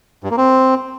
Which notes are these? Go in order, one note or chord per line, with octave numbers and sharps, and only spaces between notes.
G2
A#3
C4